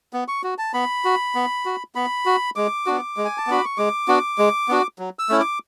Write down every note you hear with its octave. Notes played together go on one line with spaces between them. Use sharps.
B3
C#6
F#4
A5
B3 B5
F#4
B3
F#4
B3 B5
F#4
G#3 D6
B3 D4 F#4
G#3
G#5
A5
B3 D4 F#4 B5
C#6
G#3 D6
B3 D4 F#4
G#3
B3 D4 F#4
F#3
E6
A3 C#4 E4
D6